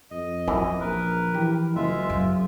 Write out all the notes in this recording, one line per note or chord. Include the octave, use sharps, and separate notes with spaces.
F2 D#5
F#2 E3 F3
A#1 A#4 B4
E3 G4
F#1 G#3 F4 E5
F#2